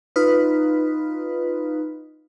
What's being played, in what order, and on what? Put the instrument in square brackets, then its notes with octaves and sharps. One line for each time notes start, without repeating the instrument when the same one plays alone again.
[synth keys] D#4 F4 B4